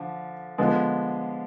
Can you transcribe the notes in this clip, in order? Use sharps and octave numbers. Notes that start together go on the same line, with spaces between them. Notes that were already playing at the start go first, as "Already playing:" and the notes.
Already playing: D3 F3
D3 F3 G#3 B3